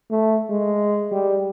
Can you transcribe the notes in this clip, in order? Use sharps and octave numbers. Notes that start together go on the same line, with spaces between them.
A3
G#3
G3